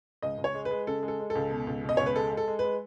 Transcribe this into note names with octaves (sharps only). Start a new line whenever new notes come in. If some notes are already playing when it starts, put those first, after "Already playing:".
C#2 D#5
C#2
C#5
G#3
B4
G#3
C#3 A4
G#3
A4
G#3
A4
C#2
B2
C#2
B2
D#5
C#2 C#5
B4
G#3 A4
G#3
A4
G#3
B4
G#3